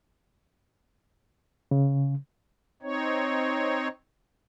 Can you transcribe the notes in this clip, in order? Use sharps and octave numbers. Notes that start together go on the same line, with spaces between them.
C#3
C4 D#4 C#5